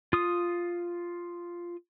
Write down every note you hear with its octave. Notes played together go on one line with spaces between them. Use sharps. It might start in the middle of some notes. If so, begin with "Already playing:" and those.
F4 D#6